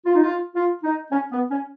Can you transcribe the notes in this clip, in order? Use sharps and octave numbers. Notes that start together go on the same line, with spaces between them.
F4
D#4
F4
F4
D#4
C#4
B3
C#4